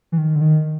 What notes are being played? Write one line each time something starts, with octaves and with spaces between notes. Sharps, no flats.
E3
D#3
D3
D#3